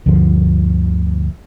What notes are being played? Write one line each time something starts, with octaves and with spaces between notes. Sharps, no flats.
D2 G2 D3 F3